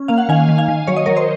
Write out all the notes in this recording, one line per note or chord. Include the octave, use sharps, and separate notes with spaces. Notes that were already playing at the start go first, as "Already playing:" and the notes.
Already playing: C#4
A#3 F5
F#5
D#3 F5 G#5
D#3
F5 G#5
D#3
F#3 C#5
D#5
F#3 A#4 C#5
C5 D#5